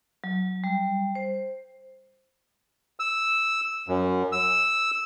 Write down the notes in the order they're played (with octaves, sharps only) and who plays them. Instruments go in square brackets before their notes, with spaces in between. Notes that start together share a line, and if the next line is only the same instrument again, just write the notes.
[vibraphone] F#3
G3
C5
[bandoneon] E6
F#2
E6